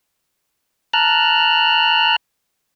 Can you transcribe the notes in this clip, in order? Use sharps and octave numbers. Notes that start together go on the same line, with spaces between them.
A5 A#5 F6 F#6